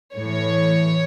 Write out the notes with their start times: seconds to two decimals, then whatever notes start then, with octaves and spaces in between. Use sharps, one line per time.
0.16 A2 E3 C#5